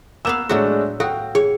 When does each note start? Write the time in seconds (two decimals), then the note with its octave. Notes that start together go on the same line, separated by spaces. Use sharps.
0.25 A#3 B3 F5 E6 E7
0.49 A2 F#3 G#3 A3 D4 F#4
1.00 F#4 A4 F5 G5
1.35 G#4 C#5